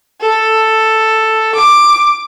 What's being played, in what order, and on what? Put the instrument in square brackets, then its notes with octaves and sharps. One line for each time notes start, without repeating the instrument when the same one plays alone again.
[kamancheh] A4
D6